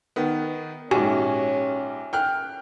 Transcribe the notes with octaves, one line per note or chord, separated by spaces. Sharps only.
D#3 B3
A#1 G#2 C#4 F#4 G4 G#5
G5 F6 F#6